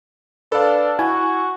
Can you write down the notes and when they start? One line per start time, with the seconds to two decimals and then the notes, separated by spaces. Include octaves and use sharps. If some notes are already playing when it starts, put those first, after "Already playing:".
0.52 D4 A4 B4 F5
0.99 E4 F#4 G#5